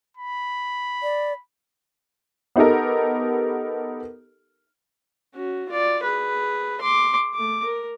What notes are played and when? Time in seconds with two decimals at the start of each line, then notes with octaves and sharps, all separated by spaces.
0.17 B5
1.03 D5
2.56 B3 D#4 G4 A4 A#4
5.35 C#4 F#4
5.69 F4 D5
6.03 G#4 B4
6.82 C6 D6
7.35 A3 D6
7.64 A#4